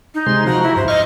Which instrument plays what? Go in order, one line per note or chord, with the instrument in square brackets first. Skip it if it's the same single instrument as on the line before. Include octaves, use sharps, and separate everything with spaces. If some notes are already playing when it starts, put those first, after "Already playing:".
[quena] D#4
[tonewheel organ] C3 G#3 C6
[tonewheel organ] F3 F#4 [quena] A#5
[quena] E4
[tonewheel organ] G2 [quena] C5
[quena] D#5 [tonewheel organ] C#6 F6